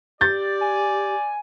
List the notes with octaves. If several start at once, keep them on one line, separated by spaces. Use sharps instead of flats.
G4 D5 G6 A6
G#5